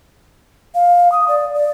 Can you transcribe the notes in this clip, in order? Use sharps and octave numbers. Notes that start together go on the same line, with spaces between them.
F5
D#6
D5
D5